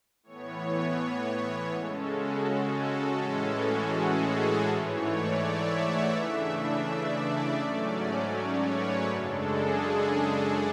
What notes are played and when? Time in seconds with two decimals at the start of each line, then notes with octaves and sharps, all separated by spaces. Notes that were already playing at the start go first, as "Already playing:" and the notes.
0.23 A2 E3 B3 C#5
1.71 C#3 G#3 C#4 A4
2.08 F#4
2.44 F#4
2.82 A4
3.19 A2 E3 G#3 C#4 A4
3.56 F#4
3.92 G#4
4.29 A4
4.66 G#2 E3 A3 C#5
5.03 D5
5.40 E5
5.77 F#5
6.13 C#3 E3 A3 D4 E5
6.50 E5
6.87 D5
7.61 G#2 F#3 A3 C#4
8.34 C#5
8.71 B4
9.08 F#2 C#3 G#3 D4 A4
9.46 G#4